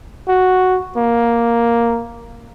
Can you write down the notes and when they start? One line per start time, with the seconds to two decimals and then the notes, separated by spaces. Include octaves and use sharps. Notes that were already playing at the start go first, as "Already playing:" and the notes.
0.28 F#4
0.97 A#3